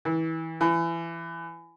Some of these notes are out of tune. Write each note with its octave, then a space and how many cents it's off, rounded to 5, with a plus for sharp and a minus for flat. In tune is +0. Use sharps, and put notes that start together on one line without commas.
E3 -25
E3 +25